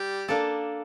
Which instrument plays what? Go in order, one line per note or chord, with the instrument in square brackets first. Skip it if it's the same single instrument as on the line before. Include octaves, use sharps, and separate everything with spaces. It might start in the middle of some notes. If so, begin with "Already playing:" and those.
Already playing: [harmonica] G3 G4
[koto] A#3 D4 A4 D5